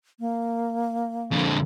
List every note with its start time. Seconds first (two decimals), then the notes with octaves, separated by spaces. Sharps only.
0.20 A#3
1.31 F2 D3